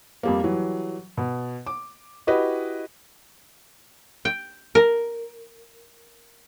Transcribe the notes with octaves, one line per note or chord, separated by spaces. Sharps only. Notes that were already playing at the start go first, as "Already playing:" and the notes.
F2 G3 A#3
E3 F#3 G3
B2
D6
E4 F#4 G4 B4 D#5
G5
A#4